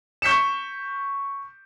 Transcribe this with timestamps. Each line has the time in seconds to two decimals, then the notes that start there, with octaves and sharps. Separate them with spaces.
0.22 C#6 G6 B6 C#7 E7